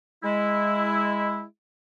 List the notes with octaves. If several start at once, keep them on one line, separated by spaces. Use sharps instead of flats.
G#3 E4